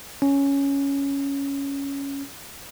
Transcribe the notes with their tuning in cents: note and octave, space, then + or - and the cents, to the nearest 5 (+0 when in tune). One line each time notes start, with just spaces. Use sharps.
C#4 +5